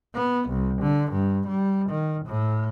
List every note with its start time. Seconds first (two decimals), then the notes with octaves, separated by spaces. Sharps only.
0.14 B3
0.49 C2
0.82 D3
1.12 G2
1.48 G3
1.90 D#3
2.26 A2